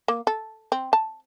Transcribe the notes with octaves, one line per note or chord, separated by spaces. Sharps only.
A#3
A4
C4
A5